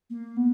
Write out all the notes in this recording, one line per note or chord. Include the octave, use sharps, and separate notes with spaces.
A#3
B3